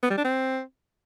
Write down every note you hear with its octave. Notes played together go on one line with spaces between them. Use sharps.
B3
G3
D4
C4